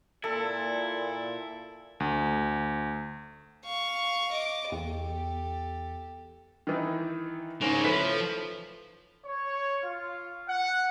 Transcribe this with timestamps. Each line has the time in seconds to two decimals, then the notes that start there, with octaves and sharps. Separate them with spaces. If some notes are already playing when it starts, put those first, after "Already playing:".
0.24 A#2 E4 A4
2.00 D2
3.65 F5 C#6
4.33 D#5 D6
4.72 E2 G4 A4
6.67 D#3 E3 D#4
7.62 G#2 C#3 A#3 C#4
7.84 A2 F3 B4 B6
9.24 C#5
9.83 F4
10.48 F#5